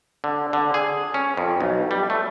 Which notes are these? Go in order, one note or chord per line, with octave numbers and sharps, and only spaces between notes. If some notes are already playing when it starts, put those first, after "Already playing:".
D3
D3
G#4
C#4
F2
B1
G3
A3